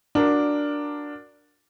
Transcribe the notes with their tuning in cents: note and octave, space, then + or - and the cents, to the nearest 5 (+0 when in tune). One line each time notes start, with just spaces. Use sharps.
D4 +0 F#4 -20 A#4 +0